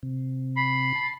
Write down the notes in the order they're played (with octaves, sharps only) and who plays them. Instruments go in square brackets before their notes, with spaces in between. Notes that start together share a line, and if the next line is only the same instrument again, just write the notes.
[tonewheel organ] C3
[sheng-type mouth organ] B5 [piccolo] C7
[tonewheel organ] A5